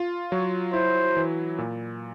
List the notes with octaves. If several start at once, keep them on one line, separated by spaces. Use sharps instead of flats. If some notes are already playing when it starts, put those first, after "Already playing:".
Already playing: F4
F#3 C#5
E4 C5
E3
A#2